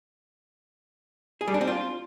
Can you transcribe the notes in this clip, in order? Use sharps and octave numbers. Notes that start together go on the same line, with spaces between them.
G#4
G3
D4
C4
F4